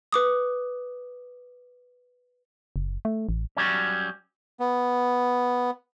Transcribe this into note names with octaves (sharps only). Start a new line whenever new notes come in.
B4 D6 D#6
F#1
A3
A1
F#3 G3 C#4
B3